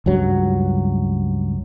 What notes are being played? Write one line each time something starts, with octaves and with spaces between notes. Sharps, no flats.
C#2 G2 F#3